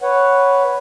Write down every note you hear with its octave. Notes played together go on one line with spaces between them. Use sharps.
B4 C#5 F#5